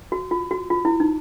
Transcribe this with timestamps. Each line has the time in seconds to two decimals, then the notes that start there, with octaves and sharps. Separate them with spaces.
0.12 F#4
0.31 F4
0.51 F#4
0.70 F4
0.85 E4
1.00 D#4